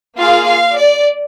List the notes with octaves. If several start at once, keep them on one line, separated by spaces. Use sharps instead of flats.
A#3 F4 G#4 F5
F5
D5